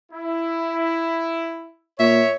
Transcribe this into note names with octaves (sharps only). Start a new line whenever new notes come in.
E4
A#2 C#5 E5